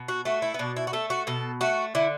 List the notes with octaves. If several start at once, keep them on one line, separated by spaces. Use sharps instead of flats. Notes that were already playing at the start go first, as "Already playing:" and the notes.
Already playing: B2
F#4
A3 F#4
E4
B3
B2 D4
E4
F#4
A3 A4
F#4
B2 A4
A3 F#4
D3 E4